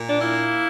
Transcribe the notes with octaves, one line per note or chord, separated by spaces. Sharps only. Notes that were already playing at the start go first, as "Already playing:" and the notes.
Already playing: A#2
D4
A#3 E4